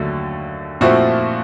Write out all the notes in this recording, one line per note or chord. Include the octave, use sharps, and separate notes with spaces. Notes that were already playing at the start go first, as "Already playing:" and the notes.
Already playing: D#2 D3 F#3 A3
A#2 F3 A3 C4 E4 F#4